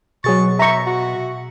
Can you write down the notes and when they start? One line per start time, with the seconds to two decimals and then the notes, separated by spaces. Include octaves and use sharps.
0.24 B2 F#3 G#4 C#6 A6
0.59 E5 A#5 C#6
0.86 F#4